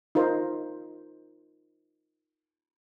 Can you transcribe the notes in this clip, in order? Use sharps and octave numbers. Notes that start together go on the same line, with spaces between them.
D#4 F4 A#4 C5